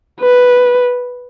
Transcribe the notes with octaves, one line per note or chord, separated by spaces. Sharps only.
B4